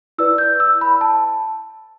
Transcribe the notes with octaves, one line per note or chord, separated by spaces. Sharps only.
E4 B4 D5 E6
G6
E6
B5
A5